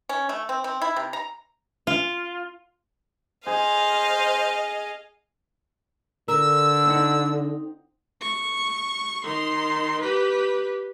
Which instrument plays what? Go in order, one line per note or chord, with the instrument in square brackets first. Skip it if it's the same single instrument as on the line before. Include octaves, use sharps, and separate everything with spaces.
[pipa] C#4
A3
C4
C4
E4
C3
A#5
[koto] F4
[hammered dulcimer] G#4 [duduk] C5 [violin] D#5 F5
[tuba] D3 [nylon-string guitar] A#4 [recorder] E6
[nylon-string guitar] C4 D#4 F#5
[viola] C#6
D#3 C6
G4 B4